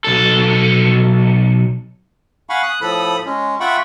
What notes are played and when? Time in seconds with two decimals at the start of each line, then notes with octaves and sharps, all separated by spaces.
0.05 B1 A4
2.49 F5 F#5 G#5 B5 C#6
2.63 D#6 F#6
2.81 A2 F3 A4 B5 D#6
3.26 G#3 C#4
3.60 F4 E5 F#5 G5 B5 C#6